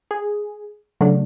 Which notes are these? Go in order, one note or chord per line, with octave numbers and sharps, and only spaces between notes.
G#4
C#3 F#3 A3 D4